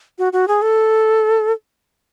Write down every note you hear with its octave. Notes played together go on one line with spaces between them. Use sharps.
F#4
F#4
G#4
A4